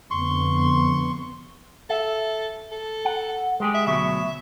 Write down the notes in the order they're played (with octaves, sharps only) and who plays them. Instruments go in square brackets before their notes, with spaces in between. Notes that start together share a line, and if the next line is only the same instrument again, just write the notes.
[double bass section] F2 D3 B3 [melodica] C6 C#6
[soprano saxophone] A4 [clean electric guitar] E5
[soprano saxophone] A4
[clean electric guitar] F#5
G#3 G4 G#4
[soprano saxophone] E5
[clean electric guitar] D2 B2 F#3 [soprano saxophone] E5